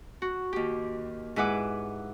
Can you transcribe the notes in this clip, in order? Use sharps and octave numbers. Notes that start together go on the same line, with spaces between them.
F#4
D#2 G4
G#2 E4 G#4 B4 F#5 D6